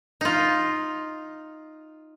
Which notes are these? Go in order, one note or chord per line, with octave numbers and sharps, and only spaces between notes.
D#4 F4